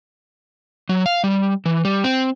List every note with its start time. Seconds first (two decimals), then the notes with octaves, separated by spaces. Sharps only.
0.89 F#3
1.06 F5
1.24 G3
1.66 E3
1.85 G3
2.04 C4